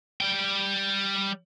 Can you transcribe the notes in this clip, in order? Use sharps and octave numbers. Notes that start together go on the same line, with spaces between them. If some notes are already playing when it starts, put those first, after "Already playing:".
G3 G5